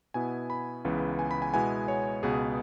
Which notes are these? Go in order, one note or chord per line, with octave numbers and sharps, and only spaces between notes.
B2 B3 E4 G#5
B5
C#2 C#3 E3 B3
G#5
B5
G#5
B2 G#3 B3 E4 G#5
C#5
C#2 B2 B3 G#4